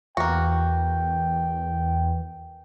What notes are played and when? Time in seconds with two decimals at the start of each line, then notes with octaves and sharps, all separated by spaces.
0.17 E2 E3 A#3 F#4 G5